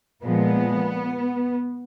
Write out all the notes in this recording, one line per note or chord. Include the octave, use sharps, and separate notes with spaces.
A#2 F3 G#3 B3